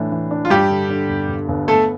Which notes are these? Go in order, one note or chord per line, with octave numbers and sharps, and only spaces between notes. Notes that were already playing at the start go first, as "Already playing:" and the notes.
Already playing: A2 E3 D4
E3
D4
F4
G2 G3 G4
D3
D3
G1
G1
G1
A3 B3 A4